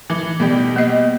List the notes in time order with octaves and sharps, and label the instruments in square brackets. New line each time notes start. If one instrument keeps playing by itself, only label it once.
[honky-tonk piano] E3
B2 G3 G4
[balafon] A#3 D#5